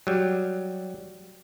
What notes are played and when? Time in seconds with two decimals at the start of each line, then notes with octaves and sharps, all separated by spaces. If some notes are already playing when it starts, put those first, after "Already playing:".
0.07 F#3 G3